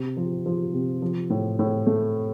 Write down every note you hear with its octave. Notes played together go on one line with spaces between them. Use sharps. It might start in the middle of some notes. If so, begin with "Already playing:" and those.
Already playing: C3
F3
F3
C3
F3
A2
A2
A3